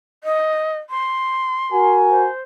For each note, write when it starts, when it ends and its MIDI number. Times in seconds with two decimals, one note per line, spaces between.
0.24 0.78 75
0.90 1.94 84
1.72 2.27 66
1.72 2.27 70
1.72 2.27 80
2.10 2.41 72